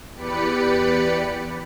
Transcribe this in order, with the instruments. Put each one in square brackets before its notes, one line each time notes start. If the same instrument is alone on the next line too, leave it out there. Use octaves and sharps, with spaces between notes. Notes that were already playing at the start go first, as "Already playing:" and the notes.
[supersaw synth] E2 G4 B4 D5 B5 C#7